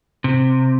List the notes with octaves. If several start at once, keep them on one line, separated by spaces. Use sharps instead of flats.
C3